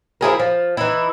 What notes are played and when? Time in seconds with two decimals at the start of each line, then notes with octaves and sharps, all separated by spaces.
0.21 F3 E4 G#4 A#4
0.39 F3
0.77 E3 D#4 E4